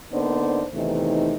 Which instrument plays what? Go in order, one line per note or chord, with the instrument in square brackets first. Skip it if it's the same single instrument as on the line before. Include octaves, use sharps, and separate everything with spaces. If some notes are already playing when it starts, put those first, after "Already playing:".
[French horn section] D3 A#3 B3 D4 D#4 C5
E2 C3 D#3 E3 A3 D#4